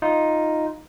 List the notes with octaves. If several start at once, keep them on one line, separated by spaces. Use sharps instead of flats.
D#4 F4